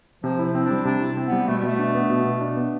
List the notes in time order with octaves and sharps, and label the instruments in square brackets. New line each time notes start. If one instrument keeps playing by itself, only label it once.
[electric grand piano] C3 [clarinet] F3
[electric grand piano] E4
[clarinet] F3
[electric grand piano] C4
[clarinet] D4
[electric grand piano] G3
[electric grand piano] C3 [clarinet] D4
[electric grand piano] E4
C4
[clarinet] B3
[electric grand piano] G3
[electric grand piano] B2 [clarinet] A3
[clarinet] G3
[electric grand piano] B2 [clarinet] A3
[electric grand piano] D4
B3
B2
B2
D4
B3